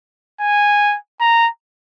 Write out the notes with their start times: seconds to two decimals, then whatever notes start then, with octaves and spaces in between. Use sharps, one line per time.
0.40 G#5
1.20 A#5